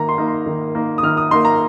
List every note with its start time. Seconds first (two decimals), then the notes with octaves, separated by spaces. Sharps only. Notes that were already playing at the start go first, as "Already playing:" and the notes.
Already playing: D#3 A#3 D#4 A#5
0.09 C6
0.18 A#3 D#4
0.28 C6
0.46 D#3
0.75 A#3 D#4
0.98 D#6
1.03 D#3 F6
1.17 D#6
1.31 A#3 D#4 C6
1.45 A#5